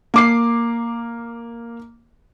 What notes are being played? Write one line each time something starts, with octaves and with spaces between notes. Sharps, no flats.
A#3 D6 C7